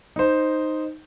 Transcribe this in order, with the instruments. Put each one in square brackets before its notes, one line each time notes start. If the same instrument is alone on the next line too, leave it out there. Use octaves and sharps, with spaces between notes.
[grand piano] D#4 C5